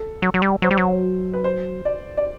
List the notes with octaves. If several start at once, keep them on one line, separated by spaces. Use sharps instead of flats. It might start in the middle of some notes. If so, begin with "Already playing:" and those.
Already playing: A4
F#3
F#3
G3
F#3 C5
G3
F#3
B4
C5
D5
D5